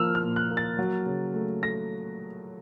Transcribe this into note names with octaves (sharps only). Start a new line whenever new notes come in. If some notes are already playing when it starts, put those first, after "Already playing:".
Already playing: F3 A#3 E6 F6
F6
A#2
F#6
A#3
A6
F#3
C#3
A3
A3 A#6